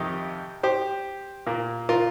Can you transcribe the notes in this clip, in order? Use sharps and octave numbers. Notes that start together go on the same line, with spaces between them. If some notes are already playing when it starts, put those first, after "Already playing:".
Already playing: F2 C3 D#3 D#4 G4
G4 C5
A#2 A#3
F4 A#4